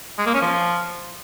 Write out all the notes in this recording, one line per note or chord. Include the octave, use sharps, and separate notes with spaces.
G#3
A#3
C#4
F3